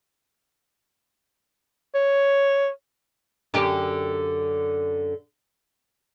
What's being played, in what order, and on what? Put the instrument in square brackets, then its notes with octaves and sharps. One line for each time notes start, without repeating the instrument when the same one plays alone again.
[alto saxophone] C#5
[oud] F#2 D3 G4